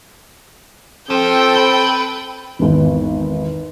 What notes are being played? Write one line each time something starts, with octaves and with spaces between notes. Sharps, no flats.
F3 C4 A4 G5
B4
G#1 E2